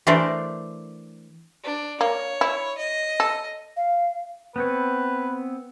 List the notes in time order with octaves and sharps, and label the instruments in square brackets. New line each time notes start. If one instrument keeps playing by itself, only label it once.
[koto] E3 A3 D4 A#4 C5 D5
[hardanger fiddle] D4
[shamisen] A#3 [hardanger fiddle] C#5
[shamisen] E4
[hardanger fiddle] D#5
[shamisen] A4
[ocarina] F5
[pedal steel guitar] B3 C4 C#5 [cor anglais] B4